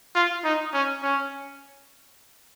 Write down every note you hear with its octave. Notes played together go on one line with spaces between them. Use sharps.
F4
D#4
C#4
C#4